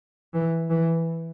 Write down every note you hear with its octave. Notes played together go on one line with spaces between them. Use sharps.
E3
E3